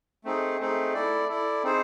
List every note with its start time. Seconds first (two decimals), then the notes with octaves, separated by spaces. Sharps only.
0.24 A3 C4 D#4 G#4
0.59 A3 C4 D#4 G#4
0.94 E4 A4 D5
1.29 E4 A4 D5
1.63 C4 D#4 G#4 C5